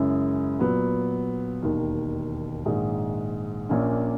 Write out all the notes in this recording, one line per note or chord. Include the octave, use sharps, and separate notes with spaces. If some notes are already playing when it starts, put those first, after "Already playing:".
Already playing: F#2 C#3 G#3 C#4 E4
A#2 F#3 B3
E1 D#2 D#3
A#1 G#2 D#3 G#3
A#1 A#2 A#3 C#4